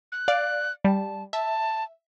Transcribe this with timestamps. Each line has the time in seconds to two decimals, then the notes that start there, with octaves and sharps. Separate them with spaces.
0.12 F#6
0.28 D5 F5
0.85 G3 A5
1.33 E5 A5